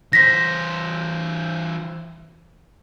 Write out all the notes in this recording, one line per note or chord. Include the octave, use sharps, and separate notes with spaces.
E3 C5 A#6 B6